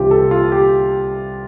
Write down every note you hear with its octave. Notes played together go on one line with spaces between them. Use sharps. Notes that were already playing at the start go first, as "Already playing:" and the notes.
Already playing: C2 C3 E3 F4 G4
A4
F4
G4